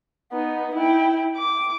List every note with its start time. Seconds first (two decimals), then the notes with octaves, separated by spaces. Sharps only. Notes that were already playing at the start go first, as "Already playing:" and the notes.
0.32 B3 D#4
0.75 E4 G5
1.37 D6